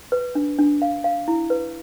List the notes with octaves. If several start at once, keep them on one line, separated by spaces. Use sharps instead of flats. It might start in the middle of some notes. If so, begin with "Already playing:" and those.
B4
D4
D4
F5
F5
E4
B4